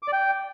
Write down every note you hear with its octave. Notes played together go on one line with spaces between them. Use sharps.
D6
D5
G5